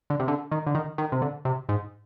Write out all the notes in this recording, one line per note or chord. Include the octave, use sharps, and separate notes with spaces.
D3
C3
D3
D#3
D3
D#3
D#3
C3
D3
C3
G#2